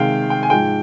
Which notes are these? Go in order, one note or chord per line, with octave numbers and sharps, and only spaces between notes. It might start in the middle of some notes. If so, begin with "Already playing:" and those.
Already playing: C3 D#3 G#3 F5 G5
G5
G#5
G#2 F3 G#3 G5